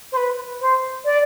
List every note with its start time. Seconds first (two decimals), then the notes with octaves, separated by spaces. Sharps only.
0.12 C5
0.16 B4
0.60 C5
1.05 D5